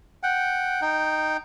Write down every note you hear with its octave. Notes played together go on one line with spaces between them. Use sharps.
F#5 G5
D#4 G5